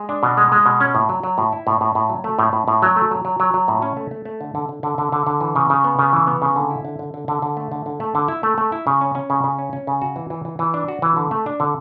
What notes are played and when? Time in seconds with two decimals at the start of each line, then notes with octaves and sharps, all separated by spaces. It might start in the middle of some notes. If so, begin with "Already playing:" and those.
Already playing: G#3
0.09 D4
0.23 B2
0.37 G#3
0.52 G#3
0.66 B2
0.81 C#4
0.95 A2
1.09 F#3
1.23 F#3
1.38 A2
1.53 E4
1.67 A2
1.81 A2
1.95 A2
2.10 F#3
2.24 A3
2.39 A2
2.53 A2
2.68 A2
2.82 F#3
2.96 A3
3.11 F#3
3.25 F#3
3.40 F#3
3.54 F#3
3.68 A2
3.82 C#4
3.97 A3
4.11 A3
4.25 A3
4.41 D3
4.55 D3
4.69 D3
4.83 D3
4.98 D3
5.12 D3
5.27 D3
5.41 E3
5.56 C#3
5.70 C#3
5.84 B3
5.99 C#3
6.13 E3
6.27 B3
6.42 C#3
6.56 D3
6.70 E4
6.85 D3
6.99 D3
7.14 D3
7.28 D3
7.42 D3
7.57 A3
7.72 D3
7.86 D3
8.00 A3
8.15 D3
8.28 E4
8.43 A3
8.58 A3
8.72 E4
8.87 C#3
9.01 C#4
9.15 C#4
9.30 C#3
9.44 C#3
9.59 C#4
9.73 C#4
9.87 C#3
10.02 F#4
10.16 E3
10.30 E3
10.45 E3
10.59 E3
10.74 D4
10.88 F#4
11.02 E3
11.17 D3
11.31 A3
11.46 D4
11.60 D3